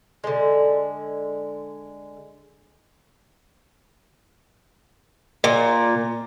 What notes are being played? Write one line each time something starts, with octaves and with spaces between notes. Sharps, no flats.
D3 G#3
A#2